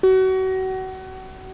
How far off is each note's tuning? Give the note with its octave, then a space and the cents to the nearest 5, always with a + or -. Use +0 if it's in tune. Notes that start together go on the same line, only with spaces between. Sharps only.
F#4 +30